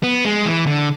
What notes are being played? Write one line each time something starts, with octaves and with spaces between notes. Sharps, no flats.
B3
G#3
E3
D3